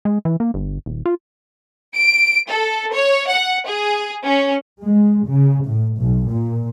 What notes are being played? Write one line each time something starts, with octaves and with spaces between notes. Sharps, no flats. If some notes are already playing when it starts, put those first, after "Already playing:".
G#3
E3
A#3
G1
D#1
F4
D7
A4
C#5
F#5
G#4
C#4
G#3
C#3
A2
B1
A#2